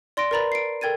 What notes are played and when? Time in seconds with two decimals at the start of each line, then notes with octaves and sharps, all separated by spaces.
0.17 D5 C6 A#6 D7
0.31 A#4 B4 D5 A#5 B5 A6
0.52 C7 D7
0.81 A4 A#4 G5 G#6 A6 D#7